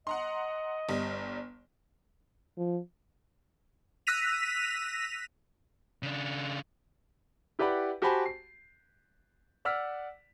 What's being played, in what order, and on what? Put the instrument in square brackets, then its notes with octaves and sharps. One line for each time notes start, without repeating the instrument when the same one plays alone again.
[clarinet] D#5 [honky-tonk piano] F#5 A#5 C6
[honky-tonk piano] G1 G3
[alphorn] F3
[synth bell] E6 F#6 A#6 B6 D#7 F7
[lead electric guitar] C#3 D4
[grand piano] E4 G4 B4 D5 F#5 B5
F#4 G4 C5 G#5 A5 B5
C7
D5 F#5 E6 F6 B6